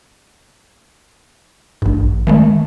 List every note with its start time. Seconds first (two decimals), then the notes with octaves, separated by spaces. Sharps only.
1.82 A1 G2
2.27 D#3 G#3 A3